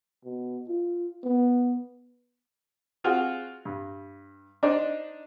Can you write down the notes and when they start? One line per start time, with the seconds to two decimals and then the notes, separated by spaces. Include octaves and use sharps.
0.24 B2
0.68 F4
1.23 B3
3.04 C4 F4 F#4 G#4
3.65 G2
4.63 D4 D#4 C5 D5